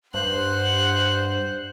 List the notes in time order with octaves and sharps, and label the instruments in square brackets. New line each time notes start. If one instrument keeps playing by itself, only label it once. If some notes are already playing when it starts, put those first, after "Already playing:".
[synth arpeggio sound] G2 [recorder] C5 [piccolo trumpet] F#5 [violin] C6 F#6